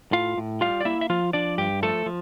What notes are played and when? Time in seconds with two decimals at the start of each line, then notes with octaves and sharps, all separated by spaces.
0.12 A2 F4 F5
0.38 A2
0.61 G3 F4 F5
0.81 D5
0.85 A#3 E4 E5
1.01 E5
1.10 F3 F4 F5
1.33 F3 D4 D5
1.58 G2 G4
1.83 F3 A3 A4
2.06 F3